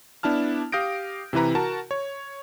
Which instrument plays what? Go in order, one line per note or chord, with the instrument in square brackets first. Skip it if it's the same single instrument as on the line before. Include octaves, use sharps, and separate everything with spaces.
[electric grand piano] B3 D4 E4 A5 F6
G4 F5 D#6 G6 A#6 D7
C3 E3 E4 B4 A#5
F#4 A#4 A5
C#5